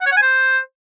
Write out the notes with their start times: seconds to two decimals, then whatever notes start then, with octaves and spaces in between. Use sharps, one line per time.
0.01 F#5
0.06 C#5
0.11 F#5
0.17 G#5
0.22 C5